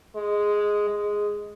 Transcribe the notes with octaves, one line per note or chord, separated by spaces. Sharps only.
G#3
G#3